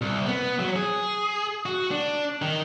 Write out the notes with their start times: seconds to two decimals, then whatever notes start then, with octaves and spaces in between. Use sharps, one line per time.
0.02 C2
0.26 B3
0.60 F#3
0.76 G#4
1.66 F#4
1.91 D4
2.42 D#3